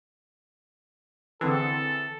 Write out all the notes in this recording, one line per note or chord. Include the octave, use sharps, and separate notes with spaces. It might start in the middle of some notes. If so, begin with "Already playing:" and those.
D3 E3 C4 G#4 A4